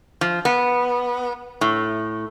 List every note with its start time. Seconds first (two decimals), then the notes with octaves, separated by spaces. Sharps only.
0.21 F3
0.45 B3
1.61 A2